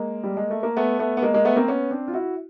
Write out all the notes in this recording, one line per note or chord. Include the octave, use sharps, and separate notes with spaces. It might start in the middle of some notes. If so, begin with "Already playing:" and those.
Already playing: G#3 A#3
G3
G#3
A3
A#3
A3 B3
A3 B3
B3
G#3 A#3
G#3 A#3
A3 B3
A#3 C4
B3 C#4
C4 D4
F4
E4 F#4